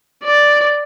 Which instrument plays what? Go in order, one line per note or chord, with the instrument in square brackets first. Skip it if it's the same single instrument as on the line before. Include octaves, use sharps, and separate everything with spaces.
[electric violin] D5